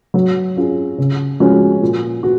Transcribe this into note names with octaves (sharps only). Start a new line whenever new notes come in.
F#3
C#4 F4 G#4
C#3
F3 G#3 C#4 F#4
A#2
F#4